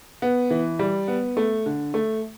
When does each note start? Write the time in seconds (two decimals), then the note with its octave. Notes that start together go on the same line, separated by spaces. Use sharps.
0.22 B3
0.50 E3
0.79 G3
1.08 B3
1.37 A3
1.66 D3
1.94 A3